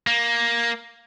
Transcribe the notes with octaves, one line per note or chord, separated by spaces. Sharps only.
A#3